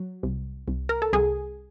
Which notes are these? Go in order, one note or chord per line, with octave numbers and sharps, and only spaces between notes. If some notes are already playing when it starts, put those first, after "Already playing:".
Already playing: F#3
C2
C2
A#4
A4
C2 G#4